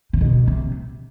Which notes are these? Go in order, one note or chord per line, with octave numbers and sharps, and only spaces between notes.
C3
B2
C3